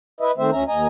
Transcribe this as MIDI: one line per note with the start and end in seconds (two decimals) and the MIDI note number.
0.21 0.31 64
0.21 0.31 71
0.21 0.31 75
0.21 0.31 76
0.38 0.50 51
0.38 0.50 57
0.38 0.50 60
0.38 0.50 72
0.38 0.50 76
0.52 0.64 38
0.52 0.64 61
0.52 0.64 76
0.52 0.64 82
0.68 0.87 39
0.68 0.87 75
0.68 0.87 80
0.68 0.87 82